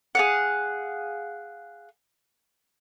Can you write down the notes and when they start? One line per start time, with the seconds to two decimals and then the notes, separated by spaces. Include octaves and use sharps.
0.15 G#4 F5 F#5